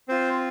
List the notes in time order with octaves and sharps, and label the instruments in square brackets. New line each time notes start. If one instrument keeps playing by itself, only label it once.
[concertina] C4 F4 C5